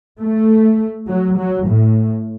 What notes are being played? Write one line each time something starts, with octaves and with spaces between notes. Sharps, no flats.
A3
F#3
F#3
A2